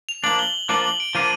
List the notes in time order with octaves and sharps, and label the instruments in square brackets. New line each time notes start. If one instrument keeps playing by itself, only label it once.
[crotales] F7
[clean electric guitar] F3 A#3 D4 [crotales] F#7
[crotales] G7
[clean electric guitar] F3 A#3 D4 F4 [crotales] F#7
[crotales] F#7
D7
[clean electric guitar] F3 A#3 D4 F4 [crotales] D#7